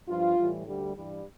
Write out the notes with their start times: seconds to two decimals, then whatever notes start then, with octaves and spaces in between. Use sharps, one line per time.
0.08 G2 F3 F4
0.38 A2 E3 G3
0.67 D2 D3 G3
0.95 G2 E3 G3